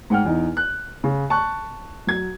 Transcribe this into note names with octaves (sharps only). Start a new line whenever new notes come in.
G#2 F#5 G5 F6
E2 D#4
F#6
C#3
A5 C#6 F#6
F#3 G#6